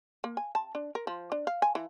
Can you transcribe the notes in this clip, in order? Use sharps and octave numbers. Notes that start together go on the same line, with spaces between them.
A#3
G#5
A5
D4
A#4
F3
D4
F5
G#5
E3